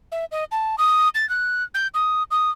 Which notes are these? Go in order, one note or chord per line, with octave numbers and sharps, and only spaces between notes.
E5
D#5
A5
D#6
A6
F#6
G6
D#6
D#6